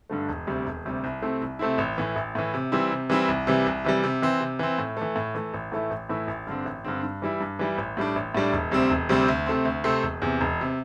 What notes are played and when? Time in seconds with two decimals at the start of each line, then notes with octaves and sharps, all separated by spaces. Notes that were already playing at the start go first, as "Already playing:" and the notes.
0.10 G2 D3 A3
0.29 E1
0.47 D2 C3 G3
0.67 E1
0.85 D2 C3 G3
1.04 C2
1.22 C3 A3 C4 E4
1.41 C2
1.59 C3 A3 C4 E4
1.78 A1
1.98 A2 E3
2.16 A1
2.35 A2 E3
2.54 C3
2.72 E3 G3 C4 E4
2.91 C3
3.10 E3 G3 C4 E4
3.28 C2
3.47 C3 E3 G3
3.66 C2
3.85 C3 E3 G3
4.03 C3
4.22 E3 C4
4.40 C3
4.59 E3 C4
4.79 A2
4.97 E3 A3
5.16 A2
5.35 E3 A3
5.54 A1
5.72 A2 E3 A3 E4
5.91 A1
6.09 A2 E3 A3 E4
6.28 A1
6.47 G2 D3 C4
6.65 A1
6.84 G2 D3 C4
7.03 G2
7.22 E3 G3 E4
7.40 G2
7.59 E3 G3 E4
7.78 A1
7.97 A2 G3 D4
8.16 A1
8.35 A2 G3 D4
8.53 E1
8.71 D2 C3 G3 C4
8.90 E1
9.09 D2 C3 G3 C4
9.28 D2
9.46 C3 A3 C4
9.65 D2
9.84 C3 A3 C4
10.03 E1
10.22 E2 C3
10.41 E1
10.61 C3